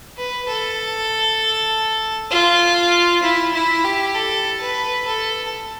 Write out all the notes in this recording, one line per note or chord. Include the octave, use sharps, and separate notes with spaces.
B4
A4
F4
E4
E4
G4
A4
B4
A4